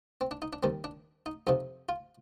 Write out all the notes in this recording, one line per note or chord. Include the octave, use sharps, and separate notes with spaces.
C4
D4
D#4
D4
D#2 D#3 G3 C4
D4
D#4
F2 C3 F3 D#4
F4